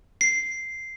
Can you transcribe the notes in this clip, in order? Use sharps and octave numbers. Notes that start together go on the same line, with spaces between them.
C7